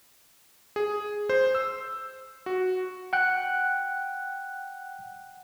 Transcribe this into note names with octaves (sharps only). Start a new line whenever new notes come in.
G#4
C5
E6
F#4
F#5 G5 F#6